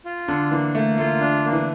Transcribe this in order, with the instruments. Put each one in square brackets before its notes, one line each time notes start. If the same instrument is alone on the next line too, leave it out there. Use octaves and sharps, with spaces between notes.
[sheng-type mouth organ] F4
[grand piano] D3 [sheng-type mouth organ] D4
[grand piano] E3 [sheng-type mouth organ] A#3
[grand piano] A3 [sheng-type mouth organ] A#3
[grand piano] A3 [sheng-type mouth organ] F4
[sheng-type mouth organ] D4
A#3
[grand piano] E3